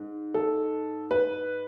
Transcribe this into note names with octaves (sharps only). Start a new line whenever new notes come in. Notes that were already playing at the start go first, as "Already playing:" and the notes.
Already playing: G#2
A4
B4